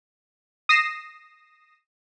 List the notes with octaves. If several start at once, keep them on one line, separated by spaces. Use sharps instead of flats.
D#6 A#6 C7 E7